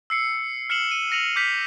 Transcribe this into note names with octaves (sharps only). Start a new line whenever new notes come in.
E6 C7 C#7
F6 C7 C#7 E7 F#7 G7
D#7
A#6 C#7 D#7 F7 F#7
D6 G6 B6 C7 F7